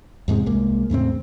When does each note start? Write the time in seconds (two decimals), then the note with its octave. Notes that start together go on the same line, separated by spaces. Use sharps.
0.28 E2 G#2 C3 G#3
0.46 C2 G#3 A#3
0.90 E2 A2 C#3 C4